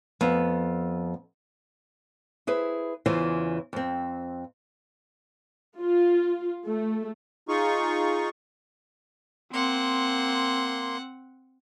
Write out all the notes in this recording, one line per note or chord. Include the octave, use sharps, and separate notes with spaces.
F2 B3
E4 G#4 B4 C5
E2 C#3 E3 F4 C5
F2 C4
F4
A3
D#4 F4 G#4 C#6
A#3 C4 F#5 C6